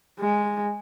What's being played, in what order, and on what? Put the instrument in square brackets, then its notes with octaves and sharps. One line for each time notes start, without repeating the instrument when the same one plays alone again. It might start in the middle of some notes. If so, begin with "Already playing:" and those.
[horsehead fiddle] G#3